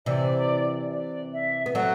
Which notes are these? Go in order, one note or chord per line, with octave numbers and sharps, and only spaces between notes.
C3 E3 D5
D5
E5
B3
F#3 A3 F#5